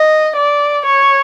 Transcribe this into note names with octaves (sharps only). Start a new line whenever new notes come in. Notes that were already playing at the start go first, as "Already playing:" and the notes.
Already playing: D#5
D5
C#5